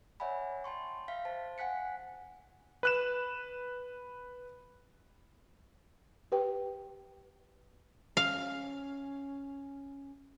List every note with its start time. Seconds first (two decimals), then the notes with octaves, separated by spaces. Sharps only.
0.20 C#5 D5 E5 F#5 G#5 B5
0.64 G5 A5 C6 C#6
1.08 E5 F5 G5 B6
1.25 C5 A5
1.58 F#5 G#5 F#6 B6 C#7
2.83 B4 F#6 E7
6.32 G4 B4 G5
8.17 C#4 F5